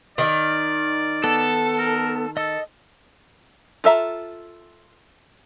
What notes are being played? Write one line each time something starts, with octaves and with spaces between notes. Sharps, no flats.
D#3 D5
B3 A4
A#4
A4 D#5 E6
F4 A4 E5 A#5